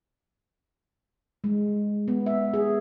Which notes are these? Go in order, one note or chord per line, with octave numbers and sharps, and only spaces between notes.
G#3
B3
E5
G#4